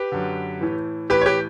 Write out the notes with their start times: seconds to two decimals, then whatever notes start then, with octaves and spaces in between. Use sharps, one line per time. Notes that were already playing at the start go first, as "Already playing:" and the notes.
Already playing: G4 B4
0.12 F#2 D3
0.61 A2 E3
1.10 A2 E3 G4 B4
1.21 C#5
1.26 G4 B4